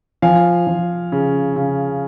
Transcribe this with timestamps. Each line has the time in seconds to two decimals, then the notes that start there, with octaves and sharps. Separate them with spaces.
0.22 F3 F5 G#5
0.67 F3
1.12 C#3
1.56 C#3